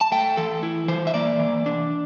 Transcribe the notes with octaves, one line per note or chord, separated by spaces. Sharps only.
A5
A3 G5
E3 A4
E4
E3 C5
E5
A#3 D5
E3
D4